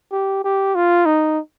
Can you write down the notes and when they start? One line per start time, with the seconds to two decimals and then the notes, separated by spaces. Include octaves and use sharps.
0.12 G4
0.44 G4
0.75 F4
1.06 D#4